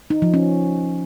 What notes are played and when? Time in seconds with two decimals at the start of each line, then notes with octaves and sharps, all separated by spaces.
0.10 D#4
0.22 F3
0.34 C#4